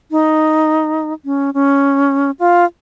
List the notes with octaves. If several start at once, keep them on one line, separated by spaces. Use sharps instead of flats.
D#4
C#4
C#4
F4